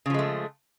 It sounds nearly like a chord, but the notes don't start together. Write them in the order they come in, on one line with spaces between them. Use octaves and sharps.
C#3 F3 G#3 A3